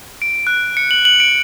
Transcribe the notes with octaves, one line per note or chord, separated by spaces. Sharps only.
D7
F#6
C#7
F#7
F#7
D7